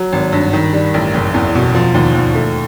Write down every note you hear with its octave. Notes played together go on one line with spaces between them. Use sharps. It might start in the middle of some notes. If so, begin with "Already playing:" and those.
Already playing: F#3
G#1
G2
D#3
G3
A1
F#1
E2
B2
F3
D#2
D#2
A3